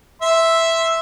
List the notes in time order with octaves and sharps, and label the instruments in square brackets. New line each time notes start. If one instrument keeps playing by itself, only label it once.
[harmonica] E5 C6